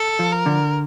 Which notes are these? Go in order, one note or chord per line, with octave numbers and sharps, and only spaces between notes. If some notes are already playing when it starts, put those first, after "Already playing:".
Already playing: A4
F3
A#4
D3